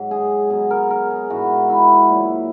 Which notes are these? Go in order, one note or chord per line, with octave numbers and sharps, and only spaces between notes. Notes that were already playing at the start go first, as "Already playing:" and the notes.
Already playing: G#2 F#3
G#4
B2 F#3 G#4
A#4
A#4
G#4
G#2 E3 G#3 F#4
E4
A#2 F#3